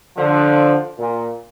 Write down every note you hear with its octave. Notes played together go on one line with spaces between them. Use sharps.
D3 F3
A#2